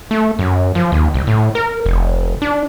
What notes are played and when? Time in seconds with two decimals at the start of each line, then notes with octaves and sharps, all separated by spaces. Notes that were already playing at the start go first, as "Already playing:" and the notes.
0.11 A3
0.39 F#2
0.75 F3
0.92 D#2
1.14 C2
1.27 A2
1.55 A#4
1.86 F1
2.42 D4